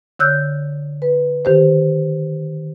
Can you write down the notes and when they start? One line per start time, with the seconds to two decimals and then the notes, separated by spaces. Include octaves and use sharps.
0.19 D3 C#5 E6 F#6 G6
1.02 B4
1.45 D#3 G4 C5